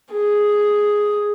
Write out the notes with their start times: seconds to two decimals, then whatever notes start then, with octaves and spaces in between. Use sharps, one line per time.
0.13 G#4